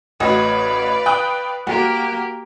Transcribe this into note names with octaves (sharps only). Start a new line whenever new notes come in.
A1 F#4 B4 D5 D#5 F5
G5 D#6 F#6
A#3 F#4 G4 A#4